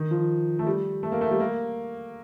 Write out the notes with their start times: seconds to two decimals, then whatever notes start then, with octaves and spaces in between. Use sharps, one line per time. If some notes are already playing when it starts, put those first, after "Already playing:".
Already playing: D#3
0.11 F3
0.59 A3
0.66 G3
1.03 A3
1.12 A#3
1.21 A3
1.31 G3
1.40 A#3